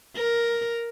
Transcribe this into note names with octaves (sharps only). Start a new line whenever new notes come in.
A#4